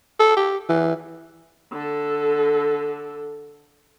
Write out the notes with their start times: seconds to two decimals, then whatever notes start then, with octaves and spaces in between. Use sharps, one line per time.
0.19 A4
0.37 G4
0.69 E3
1.73 D3 A4